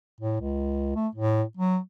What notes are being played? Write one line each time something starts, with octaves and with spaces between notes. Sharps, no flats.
A2
C#2
A3
A2
F#3